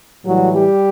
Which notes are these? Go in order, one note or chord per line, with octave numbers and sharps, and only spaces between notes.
A2 E3 F#3 G3 F#4
G3 G4